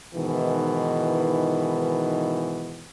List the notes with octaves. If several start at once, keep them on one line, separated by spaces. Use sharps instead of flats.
G#2 B2 D#3 E3